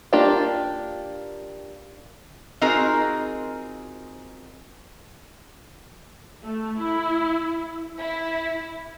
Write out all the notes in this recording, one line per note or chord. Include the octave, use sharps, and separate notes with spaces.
A#3 D4 F4 G4 G5
C4 D#4 F4 F#4 G#4 A#4
A3
E4
E4